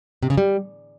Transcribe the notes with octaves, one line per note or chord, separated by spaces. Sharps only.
C3
C#3
G3